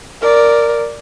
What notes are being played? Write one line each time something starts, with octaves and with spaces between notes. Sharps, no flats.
A#4 D5